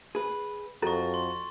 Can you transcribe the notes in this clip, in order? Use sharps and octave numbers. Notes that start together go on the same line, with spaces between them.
G#4 B4
F2 F#4 A4 A#5 C#6 A6
C6